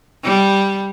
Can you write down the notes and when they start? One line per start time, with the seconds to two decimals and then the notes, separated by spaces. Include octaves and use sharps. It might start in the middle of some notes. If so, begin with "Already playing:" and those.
0.24 G3